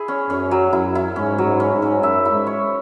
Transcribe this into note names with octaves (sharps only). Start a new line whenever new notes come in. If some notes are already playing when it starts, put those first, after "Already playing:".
Already playing: E4 G#4
C#4
F#2 C#4
F#3
F#2 E4
E4
G#2 C#4
F#3
G#2
C#4
G#2
C#4
F#2 E5
E4
G#2
C#5